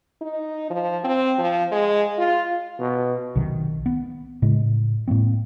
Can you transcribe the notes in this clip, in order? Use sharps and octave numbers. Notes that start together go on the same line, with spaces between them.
D#4
F3
C4
F3
G#3
F4
B2
B1 C3 D#3
B3
A2 C#3 G#3
A2 G#3 A#3 C4